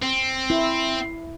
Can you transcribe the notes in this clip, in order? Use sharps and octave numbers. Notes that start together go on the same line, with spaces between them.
C4
E4